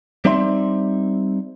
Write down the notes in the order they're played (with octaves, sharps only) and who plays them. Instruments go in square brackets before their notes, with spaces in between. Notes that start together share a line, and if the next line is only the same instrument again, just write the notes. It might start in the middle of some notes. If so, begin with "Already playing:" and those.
[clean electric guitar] G3 C4 D#4 D5 E5 C6